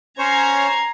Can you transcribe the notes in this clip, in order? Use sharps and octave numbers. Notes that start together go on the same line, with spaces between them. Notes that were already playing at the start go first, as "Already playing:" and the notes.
C#4 C5 C#5 A#5 G#6 C7